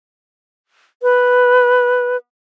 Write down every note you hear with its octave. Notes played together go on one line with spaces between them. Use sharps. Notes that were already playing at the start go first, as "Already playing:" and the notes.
B4